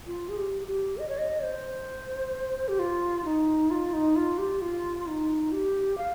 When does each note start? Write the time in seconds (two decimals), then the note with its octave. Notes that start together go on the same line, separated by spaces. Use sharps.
0.06 F4
0.29 G#4
0.37 G4
0.67 G4
0.98 D#5
1.08 C#5
1.18 D#5
1.43 C5
2.68 G4
2.79 F4
3.25 D#4
3.71 F4
3.93 D#4
4.16 F4
4.38 G4
4.61 F4
5.07 D#4
5.52 G4
5.98 F5